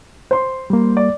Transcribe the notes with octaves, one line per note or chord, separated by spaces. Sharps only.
C5 C6
G3 A#3
D5